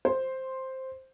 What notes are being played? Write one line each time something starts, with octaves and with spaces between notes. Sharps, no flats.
C5